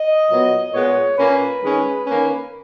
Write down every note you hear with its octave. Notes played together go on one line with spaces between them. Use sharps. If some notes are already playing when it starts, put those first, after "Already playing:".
Already playing: D#5
A#2 F#3 B3
A#2 G#3 B3 C#5
A#2 A#3 C#4 B4
D#3 G#3 C#4
D#3 A#3 C#4